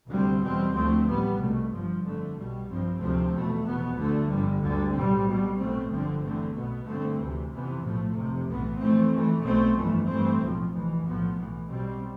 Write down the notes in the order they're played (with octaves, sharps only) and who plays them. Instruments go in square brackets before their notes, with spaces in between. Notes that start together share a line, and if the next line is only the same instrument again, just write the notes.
[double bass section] D2 C3 G3 C4
E2 B2 G3 C4
D2 D3 F3 A3 C4
A1 A2 G3 B3
C2 B2 A3
G1 G2 F3
F2 D3 A3
B1 B2 G3
G2 F3 C4
D2 C3 F3 A3 C4
E2 B2 A3
F1 E2 B2 B3
D2 D3 A3
G1 F2 D3 G3
D2 D3 G3
B1 A2 G3 C4
B1 B2 G3
B1 B2 A3 C4
G1 G2 D3 F3 C4
E2 D3 A3 C4
B1 B2 B3
G2 D3 A3 C4
D2 C3 E3
F2 C3 E3 B3
B1 A2 F3 A3
F1 F2 C3
B1 A2 E3 B3
F2 E3 A3 C4
F2 E3 A3
B1 B2 A3 C4
G1 F2 E3 A3
G2 E3 A3 C4
B1 A2 F3
F1 F2 E3
B1 A2 F3 B3
B1 A2 E3
B1 B2 G3 C4